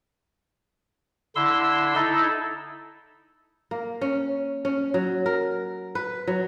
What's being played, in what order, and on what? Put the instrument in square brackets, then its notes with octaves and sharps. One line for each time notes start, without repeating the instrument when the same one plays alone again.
[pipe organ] D3 E4 C6 E6
D#4 E4 A4
[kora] A#3
C#4
C#4
F#3
A#4
B4
F#3